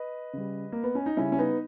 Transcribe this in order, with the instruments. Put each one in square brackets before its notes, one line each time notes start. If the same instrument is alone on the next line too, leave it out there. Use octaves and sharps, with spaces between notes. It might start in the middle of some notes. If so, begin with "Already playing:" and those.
Already playing: [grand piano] B4 D#5
C#3 G3
A#3
B3
C#4
D#4
C#3 G3 C#4 E4
C#4
B3 D#4